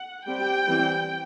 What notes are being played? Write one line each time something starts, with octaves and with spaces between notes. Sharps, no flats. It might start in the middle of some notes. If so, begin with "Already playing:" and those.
Already playing: F#5
G3 C4 G5
E3 G3 C4